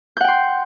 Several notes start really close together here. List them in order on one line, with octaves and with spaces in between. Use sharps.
G6 F#5 G5 C6